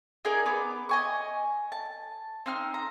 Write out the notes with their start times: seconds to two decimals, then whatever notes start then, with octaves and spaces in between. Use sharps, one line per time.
0.25 D#4 G#4 A#4 D5
0.46 B3 D6
0.89 D#5 G#5 C#6
1.72 A5
2.46 C4 D#4 F6
2.74 A#5